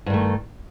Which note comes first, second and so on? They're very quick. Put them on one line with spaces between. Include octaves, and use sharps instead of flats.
G2 D#3 A3